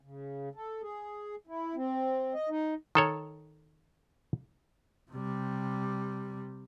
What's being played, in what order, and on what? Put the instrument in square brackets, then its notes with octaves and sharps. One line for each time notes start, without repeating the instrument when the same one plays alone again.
[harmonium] C#3
A4
G#4
E4
C4
D#5
D#4
[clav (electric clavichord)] D#3 A4 C#5
[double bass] C3 G3